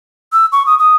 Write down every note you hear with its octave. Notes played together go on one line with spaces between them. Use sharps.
E6
C#6
D#6
D#6